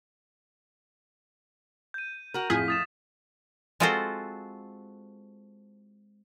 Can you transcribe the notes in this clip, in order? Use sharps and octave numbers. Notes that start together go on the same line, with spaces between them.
G6 D#7
F#4 A#4
F2 A2 F3 G#4 B6
D#6 A6 E7
G#3 C4 F4 F#4 A4 C5